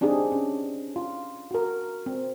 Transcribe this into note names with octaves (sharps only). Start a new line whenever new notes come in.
C4 D4 D#4 G4 G#4
C#4
F4
F#4 A#4
C4